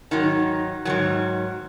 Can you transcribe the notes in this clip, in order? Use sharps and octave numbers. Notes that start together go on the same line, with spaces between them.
G#2 D#3 F#3 D#4
G#2 D#3 F#3